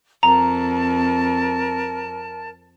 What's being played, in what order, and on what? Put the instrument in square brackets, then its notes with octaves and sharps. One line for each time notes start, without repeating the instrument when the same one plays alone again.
[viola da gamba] F2 [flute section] A#4 A5 [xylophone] A#5